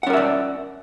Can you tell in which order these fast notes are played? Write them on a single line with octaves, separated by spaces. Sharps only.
F#5 C#4 A#4 E5 D5